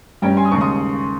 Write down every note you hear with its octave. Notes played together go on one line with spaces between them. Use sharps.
G2 G3 C#4 G5 A#5
G#5 C6
D#6
D#2 C#3 G#3 A#5 C#6
C6 D#6